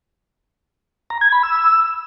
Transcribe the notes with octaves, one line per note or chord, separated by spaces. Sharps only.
A#5
G#6
B5
E6